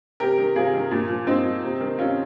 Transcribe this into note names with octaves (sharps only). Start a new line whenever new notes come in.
C3 G4 A#4
D#3
C3 F4 G#4
D#3
A#2
F3
A#2 C4 D#4
F3
C3
D#3
C3 C#4 F4